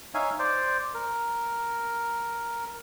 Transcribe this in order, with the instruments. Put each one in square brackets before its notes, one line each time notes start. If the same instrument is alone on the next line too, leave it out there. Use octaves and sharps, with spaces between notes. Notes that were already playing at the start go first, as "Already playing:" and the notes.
[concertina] D#4 C#5 E5 F5 G#5
C5 D5
A#4